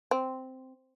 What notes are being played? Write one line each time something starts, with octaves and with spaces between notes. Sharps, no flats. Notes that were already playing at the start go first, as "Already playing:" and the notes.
C4